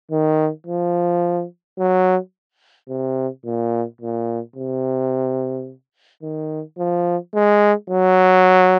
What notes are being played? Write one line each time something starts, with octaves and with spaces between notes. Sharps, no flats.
D#3
F3
F#3
C3
A#2
A#2
C3
D#3
F3
G#3
F#3